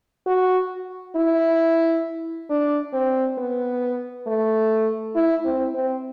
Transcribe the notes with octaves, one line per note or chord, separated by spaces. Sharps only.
F#4
E4
D4
C4
B3
A3
E4
C4
C4